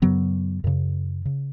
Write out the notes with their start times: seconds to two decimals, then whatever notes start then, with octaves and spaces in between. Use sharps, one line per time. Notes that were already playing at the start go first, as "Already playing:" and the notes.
0.02 F#2 C#3 F#3 B3
0.64 F#2 C#3
1.25 C#3